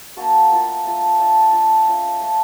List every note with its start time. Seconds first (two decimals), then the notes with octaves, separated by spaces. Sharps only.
0.16 A#3 D4 F#4 A4
0.50 A3 D4 F4 A4
0.85 A3 D4 F4 A4
1.19 A3 D4 F4 A4
1.52 A3 D4 F4 A4
1.87 A3 C#4 F4 A4
2.21 A3 C#4 F4 A4